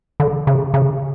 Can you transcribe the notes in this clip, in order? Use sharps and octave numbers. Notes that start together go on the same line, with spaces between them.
D3
C#3
C#3